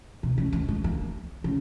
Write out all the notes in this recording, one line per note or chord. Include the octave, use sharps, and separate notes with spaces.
B2
C#3
D#3
G#3
A#3
C#3